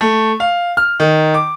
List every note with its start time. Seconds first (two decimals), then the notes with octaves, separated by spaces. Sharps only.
0.01 A3
0.40 F5
0.77 F6
1.00 D#3
1.34 D6